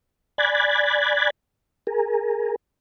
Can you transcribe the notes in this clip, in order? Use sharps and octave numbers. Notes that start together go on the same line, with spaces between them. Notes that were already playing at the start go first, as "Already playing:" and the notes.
D5 G#5 B5 F#6 G#6 A6
G#4 A#4